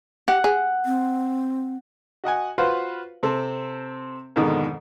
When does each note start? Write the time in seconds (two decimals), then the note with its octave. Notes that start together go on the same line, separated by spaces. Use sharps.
0.28 G4 F#5
0.44 G#4
0.85 C4
2.24 F#4 D#5 F#5 G#5
2.58 F4 F#4 B4 C5 F5
3.23 C3 C4 A4
4.36 F2 G#2 B2 D3 D#3